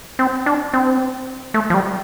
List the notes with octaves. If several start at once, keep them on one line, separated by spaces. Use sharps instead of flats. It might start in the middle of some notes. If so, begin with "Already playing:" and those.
C4
D4
C4
A3
F3
G3